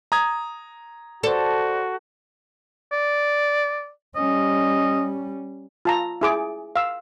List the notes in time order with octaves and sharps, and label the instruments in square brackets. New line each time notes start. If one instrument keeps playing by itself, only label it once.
[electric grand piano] A#5 D#6 G#6
[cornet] F#4 [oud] A4 [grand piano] C5 D5
[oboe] D5
[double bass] G3 C#4 [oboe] D#5
[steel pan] F4 A5 A#5
E4 G#4 D6
F5 E6